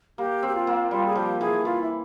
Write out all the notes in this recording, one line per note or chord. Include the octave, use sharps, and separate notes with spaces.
A#3 G4
C4
G4
F4
A#3
G3 F4
G#4
F3 G4
E3 G#4
E3 F4
E4